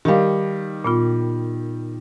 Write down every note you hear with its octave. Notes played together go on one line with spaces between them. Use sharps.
D#3 G3 G4 F5
A#2 B3 F4